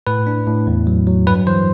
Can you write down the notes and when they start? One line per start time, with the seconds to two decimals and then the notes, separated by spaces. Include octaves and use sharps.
0.07 A2 B4
0.27 D4
0.47 A2
0.67 E2
0.87 F#3
1.07 F#3
1.27 G2 B4
1.47 E3 C5